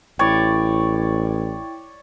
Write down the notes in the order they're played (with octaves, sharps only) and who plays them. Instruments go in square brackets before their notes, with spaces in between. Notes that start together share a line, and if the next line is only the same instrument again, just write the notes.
[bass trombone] A1 [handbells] E4 G5 [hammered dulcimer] C#5 D5